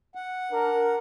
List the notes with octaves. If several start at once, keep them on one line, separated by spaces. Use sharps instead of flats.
F#5
D4 A#4